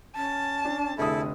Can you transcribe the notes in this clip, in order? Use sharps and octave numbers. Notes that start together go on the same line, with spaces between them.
C#4 A5
D4
F1 D3 E4 G#4 A4 D#6